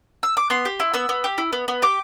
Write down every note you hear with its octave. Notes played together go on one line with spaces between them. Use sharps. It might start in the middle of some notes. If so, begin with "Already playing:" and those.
E6
D6
B3 C6
G4
E4
B3 E6
B3
G4
E4
B3
B3
G4 D6